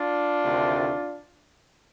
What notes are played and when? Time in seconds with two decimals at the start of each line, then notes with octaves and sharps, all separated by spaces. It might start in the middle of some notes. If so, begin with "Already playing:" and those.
Already playing: D4 F4
0.43 D2 C3 D#3 A3